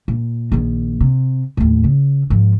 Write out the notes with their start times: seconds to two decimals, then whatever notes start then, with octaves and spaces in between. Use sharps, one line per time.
0.08 A#2
0.52 A#1 D#3
1.01 C3
1.57 D#2 A2
1.84 C#3
2.30 G#2 F3